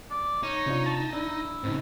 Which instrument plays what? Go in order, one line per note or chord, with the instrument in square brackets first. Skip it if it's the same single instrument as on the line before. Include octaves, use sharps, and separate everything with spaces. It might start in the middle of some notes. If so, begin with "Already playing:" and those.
[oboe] D5
[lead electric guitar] D#4 [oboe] C#5
[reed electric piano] C3 D4 F4
[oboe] A5
[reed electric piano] D4 [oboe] E4
[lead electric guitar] A2 C#3 [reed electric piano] C4 D#4